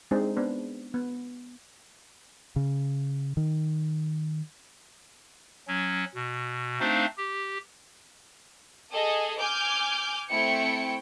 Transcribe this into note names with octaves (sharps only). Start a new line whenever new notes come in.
G#3 C4 D4 D#4 G#4 C5
B3 D4 C5
B3
C#3
D#3
F#3 C#4
B2
A3 C4 D4 D#4 C5 F5
G4
G#4 A4 D#5
G#5 D6 F6 G6
A3 C4 E4 G5 C#7